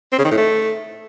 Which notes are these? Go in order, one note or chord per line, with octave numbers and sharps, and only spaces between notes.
C4
C#3
D#3
A2
A3